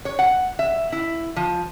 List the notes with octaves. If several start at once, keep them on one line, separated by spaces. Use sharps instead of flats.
C#5
F#5
E5
E4
F3